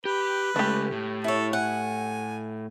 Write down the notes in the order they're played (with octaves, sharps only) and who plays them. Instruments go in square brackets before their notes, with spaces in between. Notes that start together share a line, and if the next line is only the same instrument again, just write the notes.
[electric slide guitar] G4 [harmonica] B4
[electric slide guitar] C#3 G#3 [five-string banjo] A3 G4
[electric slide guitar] A2
[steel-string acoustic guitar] E4 C#5 [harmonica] A4
[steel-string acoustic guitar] F#5 [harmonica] G#5